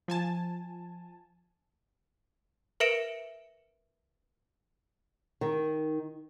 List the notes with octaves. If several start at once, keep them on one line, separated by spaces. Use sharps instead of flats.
F3 G#5 A5
A#4 B4 E5 C#7 D7 E7
D#3